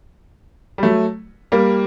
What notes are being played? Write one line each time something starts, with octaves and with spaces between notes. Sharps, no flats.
G3
F#3 A3
G3 A#3